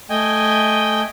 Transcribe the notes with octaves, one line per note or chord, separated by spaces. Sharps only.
A3 D#5 G5 G#5